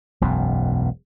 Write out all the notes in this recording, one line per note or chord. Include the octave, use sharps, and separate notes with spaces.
E1 B1 F#2 B2